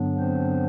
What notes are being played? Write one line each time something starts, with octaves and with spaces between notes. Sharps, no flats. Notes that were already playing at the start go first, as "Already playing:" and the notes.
Already playing: G2 D3 F#3 B3 D4
C4 C5